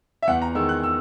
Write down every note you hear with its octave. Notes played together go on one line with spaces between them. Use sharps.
E5
E2 F#5
A#5
D#3 G#3 E6
F#6
E6